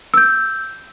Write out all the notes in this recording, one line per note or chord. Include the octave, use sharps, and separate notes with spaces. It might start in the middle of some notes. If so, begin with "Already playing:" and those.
E6 G6